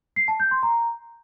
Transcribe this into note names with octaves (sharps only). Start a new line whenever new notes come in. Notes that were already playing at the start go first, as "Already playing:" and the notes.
C7
A5
G6
C6
A#5